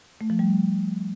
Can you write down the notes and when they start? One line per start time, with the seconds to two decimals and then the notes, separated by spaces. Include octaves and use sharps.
0.21 A3
0.30 F3
0.39 G3